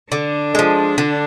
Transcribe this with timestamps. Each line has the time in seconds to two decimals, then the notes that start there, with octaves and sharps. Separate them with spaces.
0.12 D3 D4
0.55 F3 G#3
0.98 D3